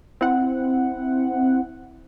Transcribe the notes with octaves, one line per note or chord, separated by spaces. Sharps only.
C4 E4 F#5